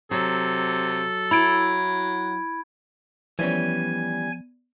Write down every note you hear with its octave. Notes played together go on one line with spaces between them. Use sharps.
C3 F#3 A4
F#3 E4 B5 G#6 D7
E3 F3 G3 B3 C#4 D5 G#5